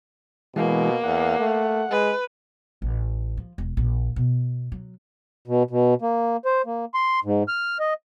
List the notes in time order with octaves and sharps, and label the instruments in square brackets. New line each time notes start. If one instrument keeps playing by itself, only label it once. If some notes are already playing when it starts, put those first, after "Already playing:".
[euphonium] B2 [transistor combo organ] E3 G#3 [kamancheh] A#3
[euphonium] E2 [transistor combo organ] F#5
[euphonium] A3
[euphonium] G#3 [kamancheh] B4
[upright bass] A1
F3
E1
A#1
B2
F#3
[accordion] B2
B2
A#3
C5
A#3
C6
G#2
F6
D#5